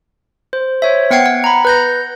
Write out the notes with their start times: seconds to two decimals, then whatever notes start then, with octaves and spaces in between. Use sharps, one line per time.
0.53 C5
0.82 C5 C#5 E5
1.11 B3 F#5 G5 G#6 C7
1.26 F#5
1.44 A#5 B5
1.65 B4 G6 A#6